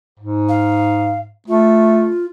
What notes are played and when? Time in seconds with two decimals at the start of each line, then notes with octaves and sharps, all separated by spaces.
0.20 G#2
0.49 F5
1.48 A3 F4